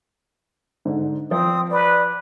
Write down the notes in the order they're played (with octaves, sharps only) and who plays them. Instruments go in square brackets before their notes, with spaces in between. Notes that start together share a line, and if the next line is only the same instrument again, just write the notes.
[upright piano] G#2 D3
[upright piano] F3 [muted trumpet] C4 [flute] D#6
[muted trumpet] B4 [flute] D5